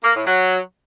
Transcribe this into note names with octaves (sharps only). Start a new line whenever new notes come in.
A#3
A2
F#3